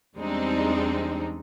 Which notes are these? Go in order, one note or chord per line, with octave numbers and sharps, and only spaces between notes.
E2 G3 G#3 C4 D4 D#4